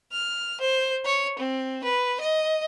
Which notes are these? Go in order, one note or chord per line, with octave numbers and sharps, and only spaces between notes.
F6
C5
C#5
C4
B4
D#5